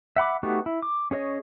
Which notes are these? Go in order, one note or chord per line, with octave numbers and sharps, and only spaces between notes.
E5 F#5 B5 D6
A3 B3 D#4 F#4 G4
E4
D6
C#4 G#4 C#5 D#5